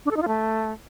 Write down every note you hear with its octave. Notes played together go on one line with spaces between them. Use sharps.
D4
A4
D#4
F4
A3